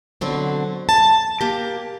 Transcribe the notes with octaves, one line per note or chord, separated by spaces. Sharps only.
B2 D3 F#3 C4
A5
A#3 G4